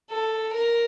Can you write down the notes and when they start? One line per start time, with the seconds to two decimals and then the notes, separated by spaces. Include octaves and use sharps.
0.11 A4
0.54 A#4